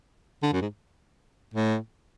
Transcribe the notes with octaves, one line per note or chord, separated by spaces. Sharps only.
D3
F#2
G#2
A2